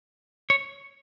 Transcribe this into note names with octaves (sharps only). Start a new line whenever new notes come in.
C#5